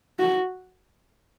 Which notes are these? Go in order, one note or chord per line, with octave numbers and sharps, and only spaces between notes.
F#4